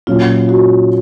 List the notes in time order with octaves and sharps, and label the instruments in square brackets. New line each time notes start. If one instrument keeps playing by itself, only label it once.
[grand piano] A#2 F#3 C#4 [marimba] F4
[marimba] F#4